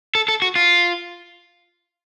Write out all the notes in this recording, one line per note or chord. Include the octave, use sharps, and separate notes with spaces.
A4
A4
F#4
F4